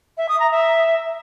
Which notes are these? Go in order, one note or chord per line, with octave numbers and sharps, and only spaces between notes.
E5
D#6
A#5
E5